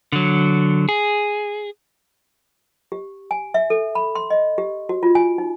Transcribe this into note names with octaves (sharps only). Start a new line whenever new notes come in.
D3 F#3
G#4
G4
G#5
E5
A4
B5
C6
D#5
G4
F#4
F4
G#5
D#4